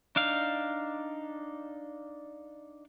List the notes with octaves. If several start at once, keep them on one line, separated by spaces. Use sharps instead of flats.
D4 D#4 F5